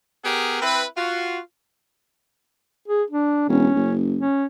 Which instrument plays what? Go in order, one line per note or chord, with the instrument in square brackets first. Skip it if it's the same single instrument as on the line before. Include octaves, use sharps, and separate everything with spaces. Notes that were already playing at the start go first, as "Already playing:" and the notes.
[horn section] B3 G4 G#4 A#4
C4 E4 B4
F4 F#4
[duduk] G#4
D4
[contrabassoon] E1 [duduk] C#4
[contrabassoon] F#1
[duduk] C#4